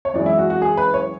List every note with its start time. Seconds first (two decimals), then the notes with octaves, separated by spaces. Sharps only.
0.05 C#5
0.14 F#2 E3 G#3 D5
0.26 E4
0.38 F#4
0.50 F#4
0.62 G#4
0.77 B4
0.94 C#5